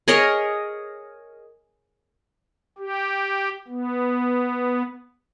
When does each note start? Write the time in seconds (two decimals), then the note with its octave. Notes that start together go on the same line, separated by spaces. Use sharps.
0.08 G#4 A#4 C#5 D#5
2.78 G4
3.68 B3